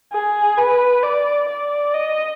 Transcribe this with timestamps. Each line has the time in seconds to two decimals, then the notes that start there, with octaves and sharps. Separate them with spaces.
0.13 G#4
0.57 B4
1.03 D5
1.49 D5
1.94 D#5